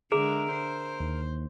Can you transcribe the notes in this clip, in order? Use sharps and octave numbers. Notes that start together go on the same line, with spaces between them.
D3 G#3 G#4 A#4 E5
C5
D#2